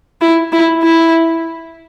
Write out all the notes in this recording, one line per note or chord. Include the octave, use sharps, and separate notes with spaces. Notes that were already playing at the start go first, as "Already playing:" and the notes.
E4
E4
E4